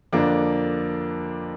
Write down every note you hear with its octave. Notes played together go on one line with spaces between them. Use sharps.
F2 D3 A#3 D4